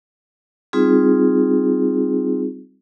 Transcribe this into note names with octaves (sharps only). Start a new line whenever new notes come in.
G3 C4 D#4 F4 G#4